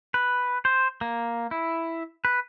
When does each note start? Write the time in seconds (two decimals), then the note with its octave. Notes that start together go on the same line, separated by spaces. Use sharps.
0.14 B4
0.65 C5
1.01 A#3
1.51 E4
2.25 B4